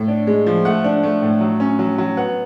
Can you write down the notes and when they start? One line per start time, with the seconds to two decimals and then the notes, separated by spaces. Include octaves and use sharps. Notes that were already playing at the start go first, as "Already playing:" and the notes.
Already playing: A2
0.08 D4
0.27 G#3
0.46 F3
0.65 A3 F#5
0.84 D4
1.03 A3
1.22 A2
1.41 F#3
1.60 C#4
1.79 F#3
1.98 F#3
2.17 B3 F#5